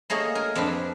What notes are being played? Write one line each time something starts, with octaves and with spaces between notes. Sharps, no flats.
A3 A#3 G#4 C#5 D#5
A#4 G#5
F2 C4 D4 B4